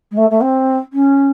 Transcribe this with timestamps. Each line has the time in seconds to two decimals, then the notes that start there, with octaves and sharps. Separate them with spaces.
0.11 G#3
0.17 A3
0.30 A3
0.42 C4
0.93 C#4